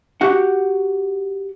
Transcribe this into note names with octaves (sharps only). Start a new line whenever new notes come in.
F#4 G4 F#5